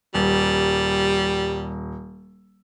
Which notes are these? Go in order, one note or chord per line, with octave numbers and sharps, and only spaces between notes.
D#1 G3